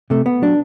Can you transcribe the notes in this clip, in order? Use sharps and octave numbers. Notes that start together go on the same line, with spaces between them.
C3 A3
B3
F#3 D4